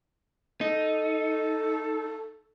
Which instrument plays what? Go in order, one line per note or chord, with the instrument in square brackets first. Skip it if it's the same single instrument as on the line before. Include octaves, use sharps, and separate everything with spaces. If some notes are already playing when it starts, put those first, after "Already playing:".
[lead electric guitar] D#4 [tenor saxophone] A4